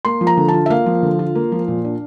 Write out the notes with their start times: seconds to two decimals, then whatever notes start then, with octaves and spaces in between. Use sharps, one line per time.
0.05 A#3 C6
0.21 F3
0.27 A#5
0.37 D3
0.48 F4 A5
0.66 E5
0.70 A#3 F5
0.86 F3
1.03 D3
1.19 F4
1.35 A#3
1.52 F3
1.68 A#2
1.84 D4